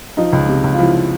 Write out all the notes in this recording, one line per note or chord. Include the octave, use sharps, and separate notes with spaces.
F3 D#4
C#2
C3
C#2
F4
F3 E4